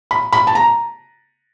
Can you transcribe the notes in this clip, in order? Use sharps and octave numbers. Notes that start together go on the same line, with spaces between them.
B5
B5
A5
A#5